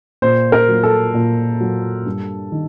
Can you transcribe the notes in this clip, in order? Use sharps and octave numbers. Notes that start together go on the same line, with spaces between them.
A#2 C5
A#4
F#3 A#3
A4
A#2
F#3 A#3
G2
D#3